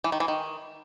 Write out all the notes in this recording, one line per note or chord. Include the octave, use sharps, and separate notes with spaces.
E3
D#3
E3
D#3